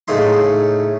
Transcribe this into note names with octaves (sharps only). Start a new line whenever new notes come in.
A2 C#3 A3 D#4 C6